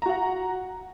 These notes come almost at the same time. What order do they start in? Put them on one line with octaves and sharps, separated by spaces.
A#5 F#4 F#5